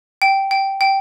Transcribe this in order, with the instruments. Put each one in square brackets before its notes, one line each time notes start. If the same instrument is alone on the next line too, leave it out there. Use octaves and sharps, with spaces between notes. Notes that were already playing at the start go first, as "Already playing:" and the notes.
[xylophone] G5
G5
G5